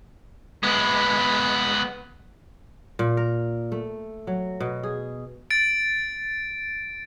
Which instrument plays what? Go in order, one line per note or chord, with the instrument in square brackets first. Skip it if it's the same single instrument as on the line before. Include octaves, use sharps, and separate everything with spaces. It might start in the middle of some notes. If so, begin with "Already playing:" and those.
[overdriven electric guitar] G#3 B3
[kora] A#2
A#4
A3
F#3
B2
G#4
[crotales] A6 D7